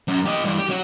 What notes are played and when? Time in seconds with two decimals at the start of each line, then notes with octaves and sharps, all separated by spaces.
0.08 F#2
0.26 G4 D#5
0.44 G2 E3
0.59 G4
0.70 F#3